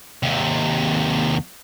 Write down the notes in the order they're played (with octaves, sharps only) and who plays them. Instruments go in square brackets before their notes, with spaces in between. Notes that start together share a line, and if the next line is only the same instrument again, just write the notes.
[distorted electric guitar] D#2 C3